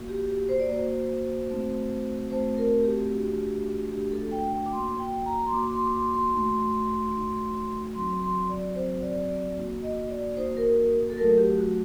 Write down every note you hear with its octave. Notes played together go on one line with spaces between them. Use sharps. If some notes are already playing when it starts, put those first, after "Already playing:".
Already playing: A#3 F#4
G4
G4
C5
D5
A#3 F#4 C5
A3 C4 D#4 F#4
A3 C4 D#4 F#4 C5
A#4
G4
A3 D4 F#4
A3 D4 F#4 G4
A4
G5
G5
D6
A#3 F#4 C6
G5
A#5
A#5
C6
A#3 F#4 D6
C6
D6
C6
C6
A3 D#4 F#4
A3 D#4 F#4
F#3 C4 F#4 C6
C6
D5
F#3 C4 F#4 C5
D5
D5
A#3 D#4 F#4
D#5
D5
A#3 D#4 F#4 C5
A#4
A#4
A4
F#3 A3 D#4 F#4 A#4
G4
F#4